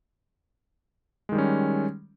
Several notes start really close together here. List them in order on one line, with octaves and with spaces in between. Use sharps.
G#3 D#3 G3 C#4